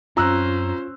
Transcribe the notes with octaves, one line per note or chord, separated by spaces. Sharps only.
F#2 C4 C#4 F4 C5 A#5 E6 F#6